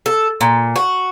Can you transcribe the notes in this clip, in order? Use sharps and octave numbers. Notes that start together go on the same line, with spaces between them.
A4
A#2
F#4